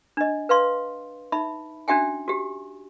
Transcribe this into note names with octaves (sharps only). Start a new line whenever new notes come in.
D4 D#5
B4 F5 C6
D#4 E5 B5
C#4 D4 F#4 E5 G5 G#5
F#4 G4